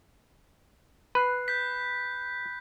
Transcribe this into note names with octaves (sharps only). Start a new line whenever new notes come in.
B4 B5 F#6 C7
G6 B6